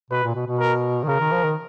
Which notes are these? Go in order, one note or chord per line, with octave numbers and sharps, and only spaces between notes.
B2 B4
A#2
B2
B2
A#4
D#3
C#3 A#4
D#3
F3
D#3